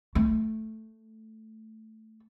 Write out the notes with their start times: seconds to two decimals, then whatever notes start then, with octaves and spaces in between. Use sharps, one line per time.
0.15 A3